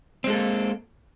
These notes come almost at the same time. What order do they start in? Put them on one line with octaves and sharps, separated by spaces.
C4 G#3 A4 A#3